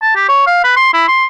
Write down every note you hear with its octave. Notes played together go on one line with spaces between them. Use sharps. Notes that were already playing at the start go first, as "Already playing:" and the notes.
A5
G4
C#5
F5
B4
C6
E4
C6